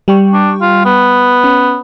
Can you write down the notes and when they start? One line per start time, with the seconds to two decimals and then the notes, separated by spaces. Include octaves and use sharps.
0.08 G3 G5 C#6
0.33 D4
0.61 F4
0.85 B3
1.44 C#4